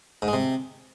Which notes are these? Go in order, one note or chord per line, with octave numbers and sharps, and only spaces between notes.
G#2
G#3
C3